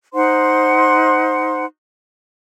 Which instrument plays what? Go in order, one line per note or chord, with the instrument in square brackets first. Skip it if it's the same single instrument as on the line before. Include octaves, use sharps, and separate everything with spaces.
[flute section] D#4 C5 F#5 C6